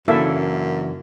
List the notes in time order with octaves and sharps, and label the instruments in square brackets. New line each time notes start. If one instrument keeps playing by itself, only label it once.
[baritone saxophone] F#2 [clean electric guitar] C#3 E3 D4 [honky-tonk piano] A#3 [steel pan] E4 A4 E5